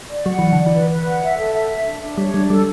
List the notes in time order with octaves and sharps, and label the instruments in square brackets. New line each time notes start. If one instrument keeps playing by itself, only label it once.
[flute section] D5
[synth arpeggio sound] F#3 [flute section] F#5
[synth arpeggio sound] E3 [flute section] D5
[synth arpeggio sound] D3 [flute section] D5
[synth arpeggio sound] E3
[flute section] B4
B4
F#5
E5
A4
E5
E5
D4
D4
[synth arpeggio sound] G3 [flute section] C#5
[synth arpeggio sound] G3 [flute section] D4
[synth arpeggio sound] G3 [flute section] A4